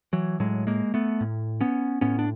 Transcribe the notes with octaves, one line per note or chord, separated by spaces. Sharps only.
E3 F#3
A2 F#3 G#3
G#3 A#3
A3 B3
A2
B3 C#4
A2 B3 C#4
D4